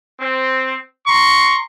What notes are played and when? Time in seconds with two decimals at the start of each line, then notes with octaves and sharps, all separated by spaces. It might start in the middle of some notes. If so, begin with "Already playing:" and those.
0.20 C4
1.07 A#5 C6 C#6